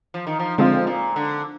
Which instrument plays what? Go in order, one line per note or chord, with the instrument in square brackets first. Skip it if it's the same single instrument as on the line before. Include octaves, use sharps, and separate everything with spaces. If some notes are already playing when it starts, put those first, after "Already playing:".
[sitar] F3
D#3
F3
[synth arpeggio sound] D3 G#3 C4 F4 [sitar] F3
[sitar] A#2
D3